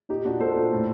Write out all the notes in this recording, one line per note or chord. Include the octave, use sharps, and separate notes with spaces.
A#2 D#4 G4
A#2 D4 F#4
A#2 A4 C5
A#2
A2